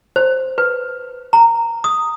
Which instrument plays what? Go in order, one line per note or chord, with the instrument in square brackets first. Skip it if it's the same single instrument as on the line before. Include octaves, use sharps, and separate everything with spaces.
[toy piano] C5
B4
A#5
D#6